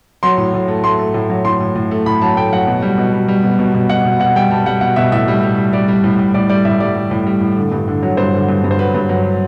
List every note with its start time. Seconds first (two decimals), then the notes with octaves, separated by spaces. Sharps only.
0.23 F#3 C6
0.38 A2
0.54 A2
0.68 A3
0.84 A3 C6
0.99 A3
1.14 A2
1.30 F#3
1.45 A2 C6
1.61 A2
1.75 A2
1.91 A3
2.06 A2 B5
2.21 F#3 A5
2.37 A3 G5
2.52 F#3 F#5
2.67 B2
2.82 G3
2.98 B2
3.13 G3
3.28 G3
3.44 B2
3.59 B2
3.74 B2
3.89 B2 F#5
4.05 B2
4.20 B2 F#5
4.36 G3 G5
4.51 G3 A5
4.66 G3 F#5
4.81 B2 F#5
4.96 B2 E5
5.12 A2 E5
5.28 G3
5.43 G3
5.58 G3
5.73 G3 D5
5.88 G3
6.04 A2
6.19 A2
6.34 A2 D5
6.49 G3 D5
6.65 A2 E5
6.80 G3 D5
6.95 G3
7.11 A2
7.26 G3
7.41 A2
7.57 D3
7.72 G2
7.88 D3
8.03 F#3
8.17 G2 C5
8.33 D3
8.49 G2
8.64 G2
8.71 C5
8.79 F#3 B4
8.94 G2
9.09 F#3